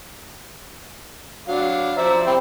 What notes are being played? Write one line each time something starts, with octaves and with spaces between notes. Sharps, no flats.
F#3 D4 F5
F3 C5 D5 E5 A#5 E6
C4 E4 G4